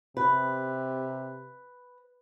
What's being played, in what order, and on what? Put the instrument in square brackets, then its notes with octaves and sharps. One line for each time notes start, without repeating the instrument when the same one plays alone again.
[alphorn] C3 [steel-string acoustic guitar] B4